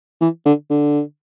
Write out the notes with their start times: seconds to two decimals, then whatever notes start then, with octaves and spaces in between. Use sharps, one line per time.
0.21 E3
0.46 D3
0.70 D3